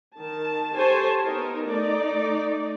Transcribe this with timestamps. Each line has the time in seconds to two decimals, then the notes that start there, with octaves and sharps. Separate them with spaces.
0.17 D#3 A5
0.74 G4 A4 C5 C#5 G#5 A5
1.24 B3 D#4 A#4
1.68 A3 D#4 D5